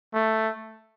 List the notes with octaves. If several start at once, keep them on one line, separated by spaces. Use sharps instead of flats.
A3